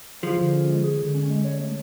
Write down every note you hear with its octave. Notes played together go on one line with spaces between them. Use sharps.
F3 G#4
D3
C#4
G#3
G#4
D3
C#4
G#3
C#5
A3